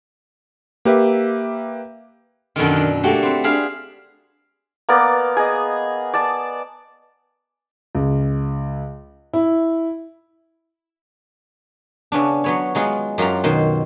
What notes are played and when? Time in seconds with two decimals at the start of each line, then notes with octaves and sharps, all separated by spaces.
0.85 A#3 G4 B4 E5
2.56 F#2 B2 D3 D#3
2.76 D4
3.03 A3 A#3 F#4 G4
3.23 C4 B4
3.44 D4 G#4 F5 B5
4.89 A#3 B3 D5
5.37 G#4 D#5
6.14 D5 A5
7.95 C#2
9.33 E4
12.12 C#3 B3 C#4 D4
12.44 F#3 B3 C#5
12.75 F#3 G#3 B3 F4
13.18 F#2 F#3 F4 G4 A#5
13.44 B2 D#3 C5